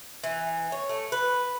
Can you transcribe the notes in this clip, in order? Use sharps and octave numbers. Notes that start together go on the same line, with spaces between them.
E3
C#5
A3
B4